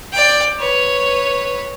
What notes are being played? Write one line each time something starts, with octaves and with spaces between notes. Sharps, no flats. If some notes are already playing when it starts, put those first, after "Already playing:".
D5 G5
B4 C#5